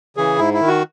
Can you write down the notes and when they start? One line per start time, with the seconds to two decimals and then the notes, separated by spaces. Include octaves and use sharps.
0.17 C#3 E3 G#4
0.38 G#2 E4
0.54 E4
0.60 D#3
0.68 F#4